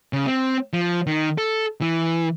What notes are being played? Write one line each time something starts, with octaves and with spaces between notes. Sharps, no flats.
C#3
C4
F3
D#3
A4
E3